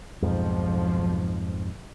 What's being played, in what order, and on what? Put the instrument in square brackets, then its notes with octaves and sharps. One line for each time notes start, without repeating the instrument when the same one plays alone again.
[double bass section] B1 F3 [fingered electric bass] F2 G#2